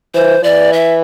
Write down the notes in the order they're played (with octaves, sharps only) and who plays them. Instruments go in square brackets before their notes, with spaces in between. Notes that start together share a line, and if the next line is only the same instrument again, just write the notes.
[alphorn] E3 [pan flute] C5
[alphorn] E3 [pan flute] D5
[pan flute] E5